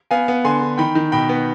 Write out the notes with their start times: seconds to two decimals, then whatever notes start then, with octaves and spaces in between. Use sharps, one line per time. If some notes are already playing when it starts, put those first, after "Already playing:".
0.11 B3 F5 G#5
0.28 B3
0.44 D3 G#5 C6
0.61 D3
0.78 D#3 G5 B5
0.95 D#3
1.12 B2 G5 B5
1.29 B3